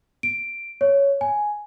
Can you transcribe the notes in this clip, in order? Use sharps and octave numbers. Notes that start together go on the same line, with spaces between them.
D7
C#5
G#5